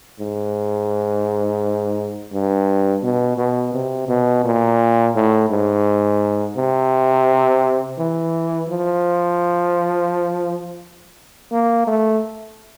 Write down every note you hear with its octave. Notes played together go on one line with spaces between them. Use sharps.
G#2
G2
B2
B2
C3
B2
A#2
A2
G#2
C3
E3
F3
A#3
A3